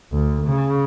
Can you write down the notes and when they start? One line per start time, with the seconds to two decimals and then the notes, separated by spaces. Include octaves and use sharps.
0.12 D2
0.47 C#3